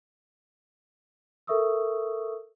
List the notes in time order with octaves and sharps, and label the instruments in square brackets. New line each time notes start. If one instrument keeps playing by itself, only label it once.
[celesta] A4 A#4 E5 C#6 D#6 E6